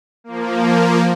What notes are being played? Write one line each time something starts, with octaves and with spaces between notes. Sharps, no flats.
F3 A#3